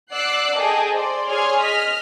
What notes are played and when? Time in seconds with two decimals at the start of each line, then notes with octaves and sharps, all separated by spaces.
0.12 D5 F#5 D6 E6 F#6 C7
0.57 G#4 A4 D#5 G5 A5
0.92 C5 D5 C6
1.29 G#4 C#5 G#5 C6 F6
1.61 D#5 F6 B6